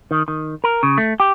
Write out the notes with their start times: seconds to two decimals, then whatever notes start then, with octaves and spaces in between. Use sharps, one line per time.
0.11 D#3
0.28 D#3
0.64 A#4
0.83 C#3
0.98 A3
1.20 G4